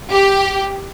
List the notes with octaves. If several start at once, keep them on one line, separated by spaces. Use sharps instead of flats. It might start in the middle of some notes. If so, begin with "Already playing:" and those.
G4